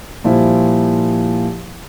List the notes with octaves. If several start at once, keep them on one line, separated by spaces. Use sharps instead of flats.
A#2 F3 G3 E4